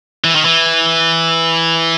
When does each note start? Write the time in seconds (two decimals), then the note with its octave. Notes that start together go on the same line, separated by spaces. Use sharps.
0.24 E3
0.35 D#3
0.45 E3